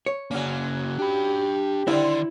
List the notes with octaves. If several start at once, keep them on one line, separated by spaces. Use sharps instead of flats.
C#5
C#3 F#3 A#3 C#4
D4 G4 B5
D3 D#3 G3 C4 E4 D5